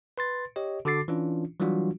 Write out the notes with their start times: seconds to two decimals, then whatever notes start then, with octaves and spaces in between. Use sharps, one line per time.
0.18 B4 C6 A6
0.56 G4 C#5 D#5
0.85 D3 F#4 A4 D6 A6 C7
1.08 E3 C#4 D4 F4
1.60 E3 F#3 G3 D4 F4 F#4